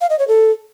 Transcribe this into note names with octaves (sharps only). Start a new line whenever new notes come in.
F5
D#5
C#5
A4